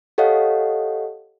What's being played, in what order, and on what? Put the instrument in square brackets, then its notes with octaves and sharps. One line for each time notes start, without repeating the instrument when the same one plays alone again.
[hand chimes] G4 A4 C#5 D#5 F5 F#5